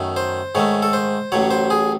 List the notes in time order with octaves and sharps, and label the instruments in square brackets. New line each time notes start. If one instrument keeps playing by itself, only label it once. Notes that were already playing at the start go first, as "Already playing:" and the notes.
Already playing: [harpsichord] F#2 D#3 A3
C5
G#2 D#3 A3 C#5
A4
C5
A1 A2 F#3 C#5
C5
G#4